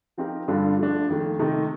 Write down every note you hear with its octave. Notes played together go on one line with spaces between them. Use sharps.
F3 C4 D#4 G4 A#4
G2 D3 G3 D4 F4
F3 A3 D4
F2 D#3 A3
C3 D#3 A3 D#4